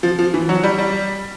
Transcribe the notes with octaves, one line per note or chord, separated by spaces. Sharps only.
F3
F3
E3
F#3
G3
G3